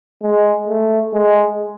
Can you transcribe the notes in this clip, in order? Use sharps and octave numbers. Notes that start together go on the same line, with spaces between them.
G#3
A3
G#3